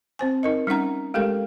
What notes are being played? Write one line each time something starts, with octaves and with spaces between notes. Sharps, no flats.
C4 C5 G#5
D#4 A#4 D#5
G3 C#4 D#4 F#5 A#5
G#3 A3 G4 A4 A#4 F5